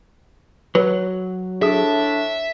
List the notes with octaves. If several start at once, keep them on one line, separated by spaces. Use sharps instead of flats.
F#3 B4
A2 D4 G#4 E5 D#6